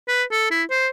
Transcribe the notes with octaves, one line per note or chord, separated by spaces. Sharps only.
B4
A4
E4
C5